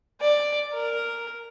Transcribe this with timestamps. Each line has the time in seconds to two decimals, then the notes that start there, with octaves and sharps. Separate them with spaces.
0.21 D5
0.74 A#4